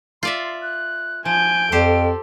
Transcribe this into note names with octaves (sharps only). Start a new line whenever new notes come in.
F4 D5 E5 C6
F#6
F3 G#5 G6 D7
F2 G4 A4 C5